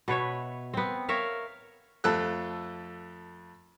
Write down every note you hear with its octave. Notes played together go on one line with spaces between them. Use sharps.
B2 B4 C#5 E5
B3 C4
A#4 C#5 E5 F5
F2 A3 A4 E6 F#6